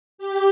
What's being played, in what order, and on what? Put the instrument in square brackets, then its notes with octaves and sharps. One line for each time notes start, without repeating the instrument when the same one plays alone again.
[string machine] G4